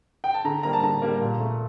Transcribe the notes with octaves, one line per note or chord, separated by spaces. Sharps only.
G5
A5
D3 A#5
G3 A#3 A#5
A5
D3 A#5
G3 A#3
A#2
A3